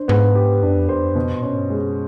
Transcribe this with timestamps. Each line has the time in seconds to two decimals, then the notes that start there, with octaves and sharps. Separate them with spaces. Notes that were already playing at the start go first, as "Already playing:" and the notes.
Already playing: D4 C5
0.08 G#2 B3
0.35 G4
0.63 F#2 D4
0.76 F2
0.89 E2 C5
1.03 F2
1.12 F#2
1.15 F2 B2
1.34 A#2
1.43 A2 C#4
1.52 G#2
1.60 G2
1.70 F#2 G#3